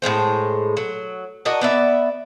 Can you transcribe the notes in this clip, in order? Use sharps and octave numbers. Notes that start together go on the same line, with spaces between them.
A2 G3 G#3 C5
F#3
D4 F#4 A#4 D#5
B3 D5 E5